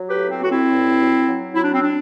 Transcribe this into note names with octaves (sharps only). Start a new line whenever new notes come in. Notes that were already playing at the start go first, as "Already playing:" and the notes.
Already playing: F#3
G4 B4
A2
C4
A2 F#4
C4 E4
G2
F#3
F#3
F#3 E4
D4
C4
D4